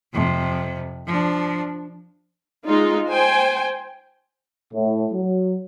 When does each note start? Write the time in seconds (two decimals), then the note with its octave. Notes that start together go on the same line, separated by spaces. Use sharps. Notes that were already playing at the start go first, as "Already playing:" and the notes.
0.14 F2 C3
1.07 F3 D4
2.66 G#3 D#4 F4
3.09 C5 G5 G#5
4.73 A2
5.13 F#3